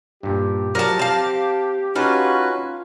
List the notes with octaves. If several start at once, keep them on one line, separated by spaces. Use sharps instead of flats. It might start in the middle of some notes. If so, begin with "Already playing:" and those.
G2 A#2 G4
F3 F#3 A#4 D5 A5
C4 F5 A5
C#4 D#4 F4 F#4 B4 A5